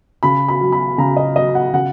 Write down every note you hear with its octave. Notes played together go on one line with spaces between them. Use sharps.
C#3 B5
B5
F#3
B5
C#3 A#5
D#5
F#3 D#5
F#5
C#3 F#5